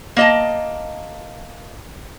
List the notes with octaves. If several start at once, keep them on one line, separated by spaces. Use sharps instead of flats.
A#3 D#5 A5